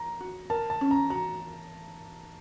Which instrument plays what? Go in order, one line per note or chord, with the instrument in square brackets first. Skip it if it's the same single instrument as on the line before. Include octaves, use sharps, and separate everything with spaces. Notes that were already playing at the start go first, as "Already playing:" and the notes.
Already playing: [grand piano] A#5
[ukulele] F#4
[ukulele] A#4 [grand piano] A5
[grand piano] A5
[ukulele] C#4
[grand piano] A#5
[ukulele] F#4 [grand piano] A#5